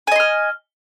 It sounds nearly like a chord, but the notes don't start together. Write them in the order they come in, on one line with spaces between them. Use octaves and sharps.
G#5 D#5 C6 F6